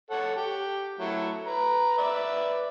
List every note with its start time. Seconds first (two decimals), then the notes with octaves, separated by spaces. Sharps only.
0.11 A4 C#5 F#5
0.37 G4
0.99 F#3 A3 E4
1.46 B4 A#5
1.98 B4 D5 E5